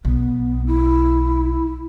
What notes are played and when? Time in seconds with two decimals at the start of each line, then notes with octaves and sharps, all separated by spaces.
0.05 B1 B3
0.67 E4